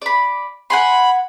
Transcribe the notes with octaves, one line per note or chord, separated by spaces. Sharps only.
D5 B5
F#5 G#5 B5 C6